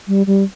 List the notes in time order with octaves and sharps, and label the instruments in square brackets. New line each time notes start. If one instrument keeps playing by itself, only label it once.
[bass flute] G3
G3